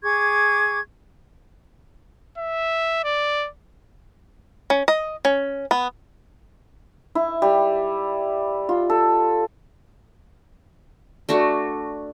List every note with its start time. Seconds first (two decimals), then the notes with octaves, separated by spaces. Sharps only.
0.03 G#4 C#6 D6 G#6
2.38 E5
3.04 D5
4.70 C#4
4.88 D#5
5.25 C#4
5.71 B3
7.15 E4
7.42 G3
8.69 F4
8.90 A4
11.29 A3 D4 F#4